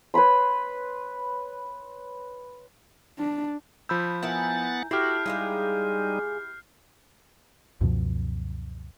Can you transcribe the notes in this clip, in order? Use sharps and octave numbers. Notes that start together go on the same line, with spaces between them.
B4 C#5 B5 C6
D4
F3 B5 E6 G6
B3 E4 A#4 F#5 G#5 A6
E4 F#4 G4 A4 F6 C7
G3 G#3 D#4 F4 G#4
C#2 F#2 B2 F3